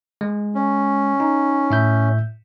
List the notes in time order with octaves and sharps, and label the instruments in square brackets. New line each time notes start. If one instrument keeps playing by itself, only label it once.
[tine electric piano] G#3
[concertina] C#4
[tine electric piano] D#4
A2 E5 G6